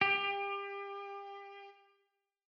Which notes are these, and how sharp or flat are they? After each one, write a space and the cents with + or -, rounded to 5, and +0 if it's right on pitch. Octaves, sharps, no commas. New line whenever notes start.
G4 +30